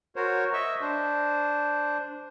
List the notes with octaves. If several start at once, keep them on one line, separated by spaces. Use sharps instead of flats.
F#4 A#4 C5 C#5
D#5 E5 C#6 E6
D4 C5